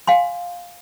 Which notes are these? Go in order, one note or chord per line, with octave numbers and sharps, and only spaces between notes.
F5 G#5 C6